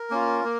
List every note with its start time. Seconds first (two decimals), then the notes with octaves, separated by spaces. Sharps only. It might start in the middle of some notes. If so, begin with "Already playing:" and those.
Already playing: A#4
0.10 A#3 C#4 F4
0.44 A#3